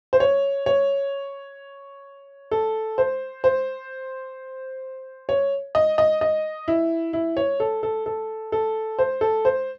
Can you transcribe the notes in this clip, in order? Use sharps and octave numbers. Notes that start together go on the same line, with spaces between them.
C5
C#5
C#5
A4
C5
C5
C#5
D#5
D#5
D#5
E4
E4
C#5
A4
A4
A4
A4
C5
A4
C5